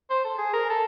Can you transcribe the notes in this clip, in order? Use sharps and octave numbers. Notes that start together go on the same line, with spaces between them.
C5
A4
G#4
A#4
A4